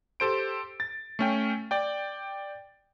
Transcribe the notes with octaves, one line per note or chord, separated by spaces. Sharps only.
G4 A4 C5 D7
A6
A3 C#4 G5
D5 G5